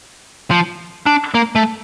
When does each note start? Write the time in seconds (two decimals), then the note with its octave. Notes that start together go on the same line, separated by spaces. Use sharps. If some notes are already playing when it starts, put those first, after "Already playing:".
0.51 F3
1.06 D4
1.34 A#3
1.55 A3